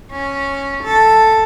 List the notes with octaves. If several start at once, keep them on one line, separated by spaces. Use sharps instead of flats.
C#4
A4